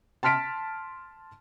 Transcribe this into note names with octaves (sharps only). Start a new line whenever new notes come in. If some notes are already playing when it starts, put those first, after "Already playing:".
A5 C6 F6 B6 D7